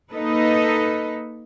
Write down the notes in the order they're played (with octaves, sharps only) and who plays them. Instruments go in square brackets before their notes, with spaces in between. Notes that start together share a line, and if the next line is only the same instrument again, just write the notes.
[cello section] A#3 D#4 A4 B4 D#5